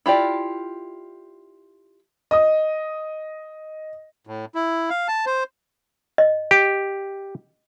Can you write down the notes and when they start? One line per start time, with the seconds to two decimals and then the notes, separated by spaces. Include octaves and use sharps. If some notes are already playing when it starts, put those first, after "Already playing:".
0.06 E4 F4 G4 D5
2.31 D#5 D#6
4.27 A2
4.55 E4
4.90 F5
5.08 A5
5.26 C5
6.18 D#5
6.51 G4